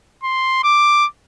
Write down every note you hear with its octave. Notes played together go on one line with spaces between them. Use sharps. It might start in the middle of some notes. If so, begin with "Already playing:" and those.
C6
D6